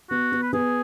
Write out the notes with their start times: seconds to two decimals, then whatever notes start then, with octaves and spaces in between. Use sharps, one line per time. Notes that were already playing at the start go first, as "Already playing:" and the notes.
0.10 B3 F#4
0.32 B3
0.42 B4
0.53 B3 G#4